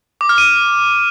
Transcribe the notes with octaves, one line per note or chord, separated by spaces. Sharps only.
D6
F6
D#7